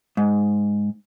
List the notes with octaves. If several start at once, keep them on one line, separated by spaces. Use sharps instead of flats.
G#2